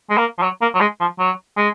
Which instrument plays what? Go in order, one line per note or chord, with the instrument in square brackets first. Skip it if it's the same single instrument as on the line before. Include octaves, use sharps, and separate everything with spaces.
[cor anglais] G#3
A#3
F3
F#3
A#3
F#3
G#3
F3
F#3
G#3